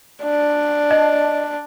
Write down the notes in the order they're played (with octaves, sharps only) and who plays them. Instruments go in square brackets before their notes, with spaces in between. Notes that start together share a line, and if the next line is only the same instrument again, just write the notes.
[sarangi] D4
[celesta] D5 D#5 A5